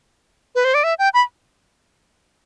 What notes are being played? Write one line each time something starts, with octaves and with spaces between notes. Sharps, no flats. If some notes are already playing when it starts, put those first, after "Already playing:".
B4
C5
D5
E5
G5
B5